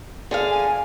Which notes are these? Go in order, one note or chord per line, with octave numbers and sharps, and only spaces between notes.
D3 G#4 F5
G#5